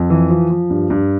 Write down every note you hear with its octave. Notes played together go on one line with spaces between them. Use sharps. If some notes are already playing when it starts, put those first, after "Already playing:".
Already playing: F2
E3
F3
F3
G2
G2